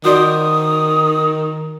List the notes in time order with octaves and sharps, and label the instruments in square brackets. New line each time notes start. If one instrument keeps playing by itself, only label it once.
[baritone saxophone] D#3 [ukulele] F#4 C5 D5 [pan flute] D#6